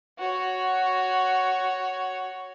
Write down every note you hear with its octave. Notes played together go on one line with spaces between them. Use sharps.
F#4 C#5